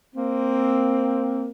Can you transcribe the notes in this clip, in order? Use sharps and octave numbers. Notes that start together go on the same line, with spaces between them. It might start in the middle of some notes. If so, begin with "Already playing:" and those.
A#3 C4